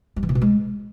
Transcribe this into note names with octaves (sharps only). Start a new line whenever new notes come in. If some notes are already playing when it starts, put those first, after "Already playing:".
G3
E3
A#2
B2
G#3